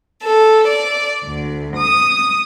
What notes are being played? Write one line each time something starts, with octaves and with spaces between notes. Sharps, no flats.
A4
D5
D2
D#6